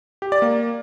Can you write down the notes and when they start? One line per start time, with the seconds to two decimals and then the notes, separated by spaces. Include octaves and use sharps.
0.22 G4
0.32 D5
0.42 A#3